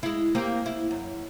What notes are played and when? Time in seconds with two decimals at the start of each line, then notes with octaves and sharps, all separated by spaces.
0.03 G#3 E4
0.35 A#3 C4 G4
0.66 E4
0.91 F#2